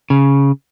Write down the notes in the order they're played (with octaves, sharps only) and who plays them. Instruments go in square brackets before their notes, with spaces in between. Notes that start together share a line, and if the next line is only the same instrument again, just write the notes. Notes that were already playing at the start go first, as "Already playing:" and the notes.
[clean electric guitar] C#3